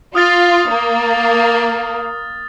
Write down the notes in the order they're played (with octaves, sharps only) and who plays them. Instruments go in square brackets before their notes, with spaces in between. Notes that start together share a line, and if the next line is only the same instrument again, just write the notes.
[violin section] F4 [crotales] D#6 F6 A6
[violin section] A#3